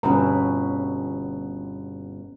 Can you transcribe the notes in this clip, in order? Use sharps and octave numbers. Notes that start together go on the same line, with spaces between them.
G1 B2 C4 C#4 B4 A#5